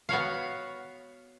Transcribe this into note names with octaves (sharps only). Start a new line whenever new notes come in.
B3 F#4 C#5 F5